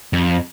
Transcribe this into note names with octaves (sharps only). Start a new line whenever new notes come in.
F2